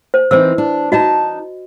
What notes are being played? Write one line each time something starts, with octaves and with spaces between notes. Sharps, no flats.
C5
E3 C4 D#4 C5 E6
D4
D4 D#4 F#4 D#5 A5